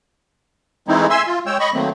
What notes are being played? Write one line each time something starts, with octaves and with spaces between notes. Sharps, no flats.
E3 G#3 A3 C4 D#4 E4
E5 G#5 C6 E6
F4
G#3 C#5 G5 E6
D#5 B5 C#6
D#3 F#3 A3 A#3 C4